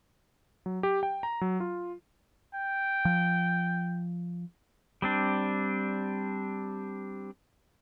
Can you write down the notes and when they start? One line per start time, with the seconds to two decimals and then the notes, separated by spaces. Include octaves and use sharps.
0.66 F#3
0.83 G4
1.03 G5
1.23 A#5
1.41 F#3
1.60 F4
2.55 G5
3.05 F3
5.02 G3 C4 D4